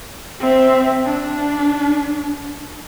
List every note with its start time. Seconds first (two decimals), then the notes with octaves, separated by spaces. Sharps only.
0.40 C4 E5
1.05 D4